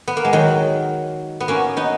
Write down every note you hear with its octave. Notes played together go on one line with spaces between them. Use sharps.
B3
A#3
G#3
D#3 F#3
B3
A#3 C#4
B3 D#4